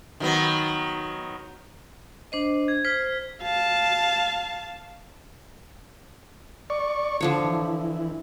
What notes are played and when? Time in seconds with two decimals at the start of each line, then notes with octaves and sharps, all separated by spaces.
0.20 D#3 F#3 B3
2.32 D4 C5 D#5
2.68 G#6
2.85 C5 F6 B6
3.43 F5 A5
6.70 D5 C#6
7.21 D3 F3 C#5
7.45 E3